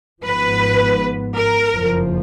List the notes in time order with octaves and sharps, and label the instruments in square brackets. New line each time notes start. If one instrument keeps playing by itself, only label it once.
[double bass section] G#1 G#2 F3 B3 [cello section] B4
[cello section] A#4
[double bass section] F#1 F2 F3